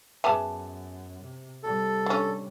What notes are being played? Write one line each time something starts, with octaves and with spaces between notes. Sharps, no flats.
F#2 G#3 B3 E5 G#5 A5 D6
C3
C3 G3 A4
D3 C#4